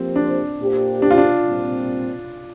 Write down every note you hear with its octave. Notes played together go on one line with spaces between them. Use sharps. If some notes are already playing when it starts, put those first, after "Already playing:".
Already playing: F3 A#3 C4 G4 C5
D4
A#2 A#3 G4 C5
D4
F4
D4
A#2 G3 C4